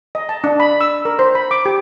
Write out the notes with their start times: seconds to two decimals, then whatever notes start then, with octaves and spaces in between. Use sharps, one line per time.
0.15 D#5
0.29 A5
0.44 D4
0.60 B5
0.81 E6
1.05 A#4
1.19 C5
1.35 B5
1.51 D6
1.66 G4